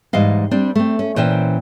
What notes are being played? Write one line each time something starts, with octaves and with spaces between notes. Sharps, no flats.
G#2 E3 G3 D#5 F5
G3 C4 D4
A3 C4
C#4
A#2 E3 C#4 C5 G5